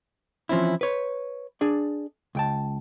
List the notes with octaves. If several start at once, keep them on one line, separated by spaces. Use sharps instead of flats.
E3 F3 C4 C#4 E4
B4 C#5
D4 G#4 D5
C#2 G5 A5